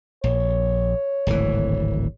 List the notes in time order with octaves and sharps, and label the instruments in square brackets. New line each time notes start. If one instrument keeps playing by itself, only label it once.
[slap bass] A#1 [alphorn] C#5
[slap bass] D1 G#1 E3